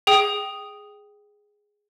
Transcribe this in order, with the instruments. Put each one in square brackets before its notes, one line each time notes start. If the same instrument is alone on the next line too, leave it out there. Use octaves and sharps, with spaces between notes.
[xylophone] G#4 G5 D#6